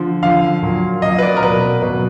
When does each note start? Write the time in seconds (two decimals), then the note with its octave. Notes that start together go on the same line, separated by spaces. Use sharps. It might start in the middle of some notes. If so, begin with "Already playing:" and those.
Already playing: D3 F3
0.23 D3 F3 F5
0.63 A#2 F#3
1.02 A#2 F#3 D#5
1.19 B4
1.22 D5
1.37 A#4
1.42 B2 F#3 B4
1.82 B2 F#3 B4